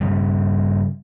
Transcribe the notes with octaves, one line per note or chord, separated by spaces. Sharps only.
G2 C#3 G3